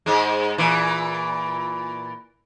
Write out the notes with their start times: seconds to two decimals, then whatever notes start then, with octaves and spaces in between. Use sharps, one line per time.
0.06 G#2 G#3
0.58 A#2 E3